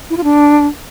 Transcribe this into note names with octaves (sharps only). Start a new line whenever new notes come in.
E4
F4
D4